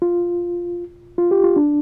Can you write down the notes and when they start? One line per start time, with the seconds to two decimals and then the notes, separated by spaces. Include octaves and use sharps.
0.02 F4
1.18 F4
1.31 G4
1.44 F4
1.56 D4